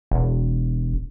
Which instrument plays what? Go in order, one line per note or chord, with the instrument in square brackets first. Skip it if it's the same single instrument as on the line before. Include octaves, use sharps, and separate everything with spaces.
[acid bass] E1